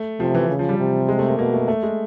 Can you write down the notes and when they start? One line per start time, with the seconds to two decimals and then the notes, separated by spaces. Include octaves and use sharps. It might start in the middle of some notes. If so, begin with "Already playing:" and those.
Already playing: A3
0.20 C3 F3
0.35 E3
0.48 C#3
0.59 F3
0.69 G3
0.79 C3
1.09 G#3
1.19 A3
1.28 A#3
1.39 B2 A#3
1.54 A3
1.68 A3
1.83 G#3